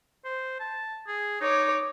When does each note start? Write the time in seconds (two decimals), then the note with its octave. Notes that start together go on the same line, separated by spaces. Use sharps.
0.25 C5
0.60 A5
1.08 G#4
1.41 D#4 C#5 D6